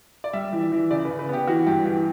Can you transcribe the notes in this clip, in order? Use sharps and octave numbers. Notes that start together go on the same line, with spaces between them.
D5
G3 E5
E3
E3
C#3 D5
C#3 B4
B4
B3 G4
E3 F#4
G2 G4
E3 G4